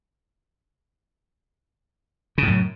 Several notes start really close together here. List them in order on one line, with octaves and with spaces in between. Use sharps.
C#3 A2 F#2